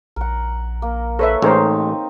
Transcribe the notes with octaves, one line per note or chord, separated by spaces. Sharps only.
A#1 A#4 F#5
A#3
A4 B4 C#5 E5
A1 G#3 C4 D#4 A#4 C5